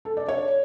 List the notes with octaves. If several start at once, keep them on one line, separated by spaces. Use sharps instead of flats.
A4
D5
C#5